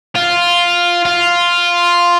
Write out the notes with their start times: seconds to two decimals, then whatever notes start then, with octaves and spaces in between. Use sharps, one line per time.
0.16 F4
1.05 F4